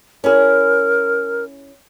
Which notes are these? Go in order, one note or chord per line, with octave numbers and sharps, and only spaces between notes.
C#4 E4 G#4 A#4